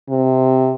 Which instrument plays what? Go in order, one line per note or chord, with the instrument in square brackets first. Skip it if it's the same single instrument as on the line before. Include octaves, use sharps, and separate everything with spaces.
[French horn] C3